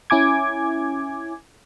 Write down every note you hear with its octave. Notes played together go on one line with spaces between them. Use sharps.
C#4 E4 G#5 D6 G#6